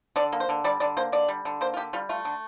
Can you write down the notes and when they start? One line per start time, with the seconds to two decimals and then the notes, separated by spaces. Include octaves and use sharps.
0.16 D3 D5
0.32 A#3
0.40 C5
0.49 D3
0.64 G3 D5
0.80 D3 D5
0.97 A#3 C5
1.12 D3 D5
1.28 G3
1.45 D3
1.61 A#3 C5
1.74 F4
1.77 D3 G4
1.93 G3 F4
2.09 A3 F4
2.25 D3